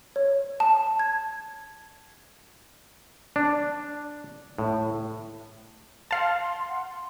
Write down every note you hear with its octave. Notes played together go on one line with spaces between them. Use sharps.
C#5
A5
G#6
D4
A2
F5 A5 C6
F#5
C6